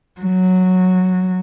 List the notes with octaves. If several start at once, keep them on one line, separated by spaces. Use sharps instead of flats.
F#3